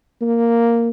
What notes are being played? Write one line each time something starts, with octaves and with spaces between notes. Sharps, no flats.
A#3